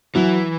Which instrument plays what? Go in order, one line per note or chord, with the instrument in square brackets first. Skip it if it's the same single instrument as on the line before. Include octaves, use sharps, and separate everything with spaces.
[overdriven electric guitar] E3 [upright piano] F#3